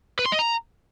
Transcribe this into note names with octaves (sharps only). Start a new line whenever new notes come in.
B4
C6
D#5
A#5